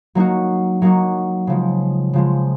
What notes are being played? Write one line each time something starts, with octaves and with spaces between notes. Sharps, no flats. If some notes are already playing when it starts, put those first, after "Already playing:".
F#3 A#3 D#4 F#4
F#3 A#3 D#4 F#4
C#3 F3 G#3
C#3 F3 G#3